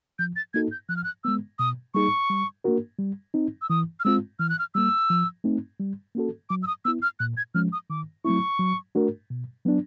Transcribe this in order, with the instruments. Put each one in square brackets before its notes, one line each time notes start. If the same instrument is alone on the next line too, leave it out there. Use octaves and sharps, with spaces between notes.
[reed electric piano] F3 [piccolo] G6
[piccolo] A6
[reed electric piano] A#3 D#4 F#4 A4 [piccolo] G#6
[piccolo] G6
[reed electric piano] F3 [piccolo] F#6
[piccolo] F6
F#6
[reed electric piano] G#3 B3 [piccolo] E6
[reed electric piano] B2 [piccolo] D#6
[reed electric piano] G3 A#3 D#4 G#4 [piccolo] C#6
[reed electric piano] G3
A#3 D4 F#4 A#4
G3
C4 D#4
[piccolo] E6
[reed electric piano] E3 [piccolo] D#6
[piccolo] F6
[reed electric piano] G#3 C4 F4 [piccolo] E6
[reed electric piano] E3 [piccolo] F6
[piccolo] F#6
F6
[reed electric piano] G3 A#3 [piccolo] E6
[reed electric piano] F3
A3 C4 D#4
G3
A#3 C#4 F#4 A4
[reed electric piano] F#3 [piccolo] D6
[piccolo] E6
D#6
[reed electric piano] B3 E4 [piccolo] E6
[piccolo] F6
[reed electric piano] A#2 [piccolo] F#6
[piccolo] G#6
[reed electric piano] F3 G#3 C#4 [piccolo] F6
[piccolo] D#6
[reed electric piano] D#3 [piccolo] D6
[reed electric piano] F#3 A3 C4 E4 [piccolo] C#6
[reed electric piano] F#3
A3 D4 F#4 A#4
B2
F#3 B3 D4